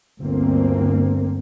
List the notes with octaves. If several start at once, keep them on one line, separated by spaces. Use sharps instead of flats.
G1 D2 A#3 C4